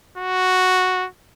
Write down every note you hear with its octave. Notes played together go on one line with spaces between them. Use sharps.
F#4